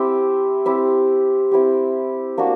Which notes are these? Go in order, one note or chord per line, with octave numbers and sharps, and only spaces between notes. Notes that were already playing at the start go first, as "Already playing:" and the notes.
Already playing: C4 E4 G4
C4 E4 G4
C4 E4 G4
A#3 D4 F#4